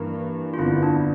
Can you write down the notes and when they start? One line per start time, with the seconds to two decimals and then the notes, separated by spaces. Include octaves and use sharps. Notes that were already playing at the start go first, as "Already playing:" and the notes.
Already playing: G2 E3 A#3
0.54 F4
0.58 G1 F2 D3 E4
0.83 D4